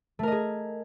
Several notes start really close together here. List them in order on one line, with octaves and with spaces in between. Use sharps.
A3 A#4 D#5 G#4